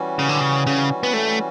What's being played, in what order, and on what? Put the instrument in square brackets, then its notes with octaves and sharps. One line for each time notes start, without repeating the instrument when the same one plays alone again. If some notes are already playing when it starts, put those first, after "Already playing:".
Already playing: [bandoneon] E3 G3 C#4 F#4
[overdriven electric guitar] C#3
D3
C#3
C#3
B3
A3